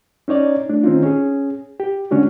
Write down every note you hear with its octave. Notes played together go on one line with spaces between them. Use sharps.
C#4 D#4 C#5 D5
A3 D4
D#3 C4 C#4 D#4 F4
C#4 G#4
G4
D3 G#3 C#4 D4 F#4